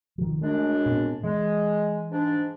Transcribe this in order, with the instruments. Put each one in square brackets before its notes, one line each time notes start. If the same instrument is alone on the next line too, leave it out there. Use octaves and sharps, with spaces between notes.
[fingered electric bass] D#3 F3
[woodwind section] F#2 G#3 D4 [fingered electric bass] A3
[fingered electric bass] A#2 B3 C4
[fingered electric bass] E3 [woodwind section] G#3
[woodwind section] G#2 D4